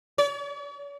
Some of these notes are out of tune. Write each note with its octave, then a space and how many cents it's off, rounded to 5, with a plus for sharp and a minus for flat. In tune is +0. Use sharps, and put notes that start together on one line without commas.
C#5 +45